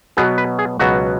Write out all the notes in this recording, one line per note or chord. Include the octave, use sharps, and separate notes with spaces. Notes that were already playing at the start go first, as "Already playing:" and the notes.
B2 F#3 B3 G#4
B4
G#4
C#2 B2 F#3 B3 F#4